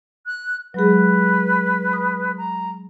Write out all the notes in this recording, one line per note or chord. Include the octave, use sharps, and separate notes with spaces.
F#6
F#3 G#3 G#4 B4
B5 D#6
A#5